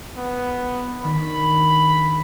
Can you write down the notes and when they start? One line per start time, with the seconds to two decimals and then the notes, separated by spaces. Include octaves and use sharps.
0.17 B3
1.04 D#3 D4 B5